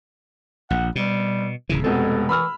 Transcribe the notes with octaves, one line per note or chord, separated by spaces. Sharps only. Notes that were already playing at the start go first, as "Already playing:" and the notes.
A#1 F#5
B2 G3
D1 C#3 E3
F1 B2 G#3 C4 A4
E3 B5 E6 F6